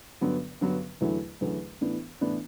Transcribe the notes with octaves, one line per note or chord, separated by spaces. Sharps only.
G2 D3 F#3 B3
G2 D3 F#3 B3
E2 D3 F#3 A3 E4
E2 D3 F#3 A3 E4
A2 E3 B3 D4
A2 E3 B3 D4